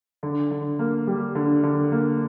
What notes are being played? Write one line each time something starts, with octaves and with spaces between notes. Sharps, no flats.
D3
D3
A#3
G3
D3
D3
A#3